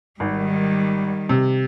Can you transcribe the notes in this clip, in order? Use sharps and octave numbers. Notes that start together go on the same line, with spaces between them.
G#1 D#3 G3
C3